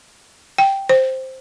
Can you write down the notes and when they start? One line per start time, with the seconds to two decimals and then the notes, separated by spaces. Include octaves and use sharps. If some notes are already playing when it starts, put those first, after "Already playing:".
0.58 G5
0.89 C5